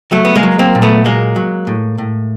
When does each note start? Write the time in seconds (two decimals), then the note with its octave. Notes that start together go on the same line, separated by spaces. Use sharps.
0.12 F#3 A3
0.25 B3
0.36 G#3 A#3
0.43 F#3
0.59 A#3 C4
0.75 A#2
0.82 A3 B3
1.05 F#3 G#3 A#3
1.36 F#3
1.67 A2
1.98 A2